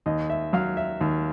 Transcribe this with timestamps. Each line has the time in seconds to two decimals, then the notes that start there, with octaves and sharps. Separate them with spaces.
0.06 D#2 D#5
0.30 E5
0.53 F#3 F5
0.77 E5
1.01 D#2